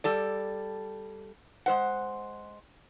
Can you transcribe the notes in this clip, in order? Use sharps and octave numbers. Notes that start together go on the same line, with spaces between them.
G3 A4 D5
G#3 C5 F#5